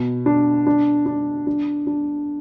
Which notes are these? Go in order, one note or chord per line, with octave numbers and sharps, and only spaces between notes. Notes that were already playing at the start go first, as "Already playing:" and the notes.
Already playing: B2
D4
D4
D4
D4
D4